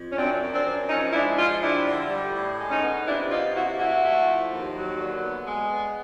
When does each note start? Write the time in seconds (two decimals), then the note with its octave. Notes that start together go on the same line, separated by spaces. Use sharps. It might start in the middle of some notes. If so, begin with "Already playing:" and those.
Already playing: F2
0.11 C#4
0.17 F#2 C4 D4
0.42 F#2
0.53 C4 D4
0.65 F#2
0.89 F3 C#4 D#4
1.13 G#3 D4 E4
1.38 F3 D#4 F4
1.62 G3 D4 E4
1.86 D3
2.10 G3
2.34 A2
2.58 G#3
2.70 C#4 D#4
2.83 B3
3.06 C3 D4 E4
3.30 A#3 D#4 F4
3.54 C3 E4 F#4
3.78 A3 E4 F#4
4.03 A3
4.27 F3
4.51 D#2
4.76 F#3
4.99 D3
5.23 B3
5.47 G#3
5.71 B3